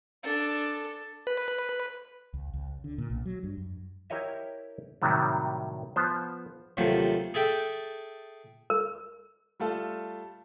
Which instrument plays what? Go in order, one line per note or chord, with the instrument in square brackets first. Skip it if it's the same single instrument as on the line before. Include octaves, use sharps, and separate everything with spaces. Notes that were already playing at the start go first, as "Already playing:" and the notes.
[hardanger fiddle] D4 A4
[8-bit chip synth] B4
[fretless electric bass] C#2
C#2
D3
A#2
B1
F#3
G2
F#2
[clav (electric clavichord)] E4 G4 A#4 C#5 D#5 E5
A2 C3 D#3 F#3 G3
F3 B3 C5
[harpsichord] D#2 C3 F3 F#3 A3
G#4 A4 E5 G5
[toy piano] A#4
[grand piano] G3 A3 F4 A4